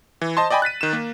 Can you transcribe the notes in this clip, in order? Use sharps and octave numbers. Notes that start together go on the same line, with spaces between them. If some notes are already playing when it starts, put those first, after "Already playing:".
E3
C5 D#5 A5 C6
D5 D#5 G5 G#5 B5
F#6 A6 B6 D#7
D#3 E7
A#3